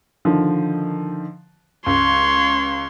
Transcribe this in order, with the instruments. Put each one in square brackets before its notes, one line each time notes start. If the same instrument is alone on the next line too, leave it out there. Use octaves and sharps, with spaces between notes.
[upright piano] D3 D#3 F3
[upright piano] C#2 [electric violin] C#5 C6